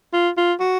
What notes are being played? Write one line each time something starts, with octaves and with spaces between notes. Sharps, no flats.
F4
F4
F#4